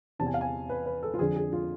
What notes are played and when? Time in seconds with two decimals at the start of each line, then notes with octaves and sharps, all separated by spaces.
0.19 E2 C3 E3 A5
0.27 G#5
0.34 F5
0.41 G#5
0.69 B4
0.86 B4
1.03 A4
1.14 F4
1.19 F2 D3 F3 G#4
1.36 G#4
1.53 F4